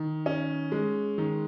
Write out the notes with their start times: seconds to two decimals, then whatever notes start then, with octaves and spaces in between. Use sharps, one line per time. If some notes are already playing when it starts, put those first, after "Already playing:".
Already playing: D#3
0.26 C#4
0.72 G#3
1.18 D#3